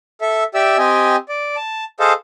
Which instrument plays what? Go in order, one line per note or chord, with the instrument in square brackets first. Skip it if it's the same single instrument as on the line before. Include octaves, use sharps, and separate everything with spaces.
[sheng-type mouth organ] A4 E5
G4 D5 E5 E6
C4 G4 D#5 G#5
D5
A5
G#4 A4 C5 D#5 F5 A5